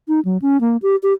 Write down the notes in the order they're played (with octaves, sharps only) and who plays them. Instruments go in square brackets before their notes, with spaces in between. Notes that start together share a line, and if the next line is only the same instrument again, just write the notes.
[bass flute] D#4
F#3
C#4
A#3
G4
G4